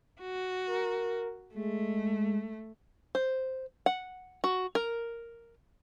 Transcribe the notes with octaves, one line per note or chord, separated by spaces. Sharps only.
F#4
A#4
G#3 A3
C5
F#5
F#4
A#4